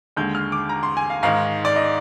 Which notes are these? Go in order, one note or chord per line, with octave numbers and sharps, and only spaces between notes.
D#2 D3 G#3 G6
F6
D6
A#5
C6
G#5
F5
G#2 D#3 G#3 D#4 F5
D5
D#5